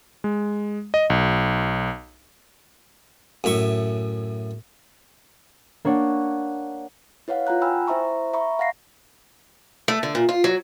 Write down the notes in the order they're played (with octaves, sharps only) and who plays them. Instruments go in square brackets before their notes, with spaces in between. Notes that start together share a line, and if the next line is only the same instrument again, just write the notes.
[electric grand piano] G#3
D#5
B1
[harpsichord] F#2 A2 E5 C#6
[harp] A#3 D4 C#5 F#5
[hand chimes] E4 B4 C#5 F5 F#5
F4 F#5 A#5 F#6
G5 G#5 B5 E6 F6
E4 C5 E5 A#5 C#6
E5 A#5 B5 C#6
F5 F#5 A#6 C7
[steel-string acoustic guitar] A3
D3
A#2
F4
F#3